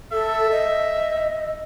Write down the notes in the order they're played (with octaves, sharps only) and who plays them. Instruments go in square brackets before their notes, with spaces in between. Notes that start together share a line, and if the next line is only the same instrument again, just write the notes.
[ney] A4 [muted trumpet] E5
[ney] D#5